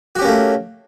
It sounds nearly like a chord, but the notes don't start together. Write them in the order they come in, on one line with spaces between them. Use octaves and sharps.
F#4 G4 C#4 A#3 A3